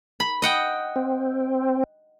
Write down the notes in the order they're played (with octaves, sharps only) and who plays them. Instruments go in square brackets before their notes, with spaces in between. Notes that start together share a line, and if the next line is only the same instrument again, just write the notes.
[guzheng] B5
D#5 F#5 G5
[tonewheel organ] C4